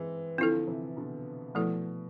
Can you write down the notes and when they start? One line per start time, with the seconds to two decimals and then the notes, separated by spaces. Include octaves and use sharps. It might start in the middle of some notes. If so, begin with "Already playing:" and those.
Already playing: E3 G#3 C4
0.38 D3 F3 C4 E4 A4
0.67 C3 E3
0.96 B2 D3
1.55 B2 F3 A3 E4 A4